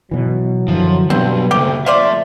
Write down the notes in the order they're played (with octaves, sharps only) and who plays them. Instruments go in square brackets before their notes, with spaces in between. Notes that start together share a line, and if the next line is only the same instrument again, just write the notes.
[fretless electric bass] B2 E3 [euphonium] F#3
[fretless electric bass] F#2 D3 E3 [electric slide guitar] F3
[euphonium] G2 [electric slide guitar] B2 F#3 [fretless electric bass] B3 [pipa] C4
[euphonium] D2 [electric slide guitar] C#3 A#3 [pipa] G4
[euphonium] F2 [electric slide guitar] A3 E5 [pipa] F4 C5 D5